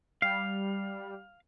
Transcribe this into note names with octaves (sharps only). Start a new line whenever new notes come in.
G3 F5